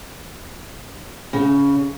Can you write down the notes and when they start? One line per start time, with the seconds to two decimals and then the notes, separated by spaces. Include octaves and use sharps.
1.33 C#3